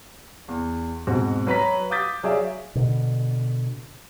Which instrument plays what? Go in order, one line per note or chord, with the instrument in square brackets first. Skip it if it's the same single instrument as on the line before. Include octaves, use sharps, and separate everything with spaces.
[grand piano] E2
G#2 B2 C4 F#4
F#3 B4 A#5 B6
F5 D6 D#6 G6 A6 B6
F#3 G#4 D5 E5 F5
[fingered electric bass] B2 D3